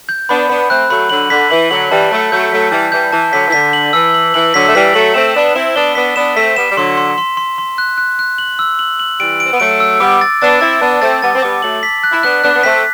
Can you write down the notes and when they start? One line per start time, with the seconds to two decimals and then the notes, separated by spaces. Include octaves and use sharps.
0.09 G6
0.29 B3 D4 B5
0.49 B3 D4 B5
0.69 A3 C4 F#6
0.90 F#3 A3 B5
1.09 D3 F#3 F#7
1.30 D3 B6
1.50 E3 F#7
1.71 D3 F#3 F#7
1.91 E3 G3 A5
2.11 F#3 A3 A5
2.31 F#3 A3 G6
2.52 F#3 A3 B6
2.72 E3 G3 A5
2.92 E3 G3 G6
3.12 E3 A5
3.32 D3 F#3 B6
3.47 E3
3.52 D3 B6
3.73 F#7
3.93 E3 E6
4.14 F#7
4.34 E3 F#7
4.54 D3 F#3 B6
4.67 A3
4.74 E3 G3 B6
4.94 F#3 A3 F#7
5.14 A3 C4 E7
5.35 B3 D4 E7
5.55 C4 E4 E7
5.76 B3 D4 G7
5.95 B3 D4 B6
6.16 B3 D4 E7
6.36 A3 C4 B6
6.56 G3 B3 E7
6.70 G3
6.77 D3 F#3 C6
6.97 C6
7.18 C6
7.37 C6
7.58 C6
7.78 F#6
7.98 F#6
8.19 F#6
8.38 F#7
8.59 E6
8.79 F#7
9.00 F#7
9.19 E3 G3 D7
9.40 C4 D7
9.52 B3
9.60 F#3 A3 D7
9.80 E6
10.00 G3 B3 D6
10.21 A6
10.41 B3 D4 A6
10.61 C4 E4 A6
10.81 B3 D4 A5
11.01 A3 C4 A6
11.22 G3 B3 A6
11.35 C4
11.42 G3 B3 D6
11.62 F#3 A3 F#7
11.83 B6
12.03 F#6
12.12 E4
12.23 B3 D4 F#6
12.43 B3 D4 F#6
12.54 B3
12.63 A3 C4 B6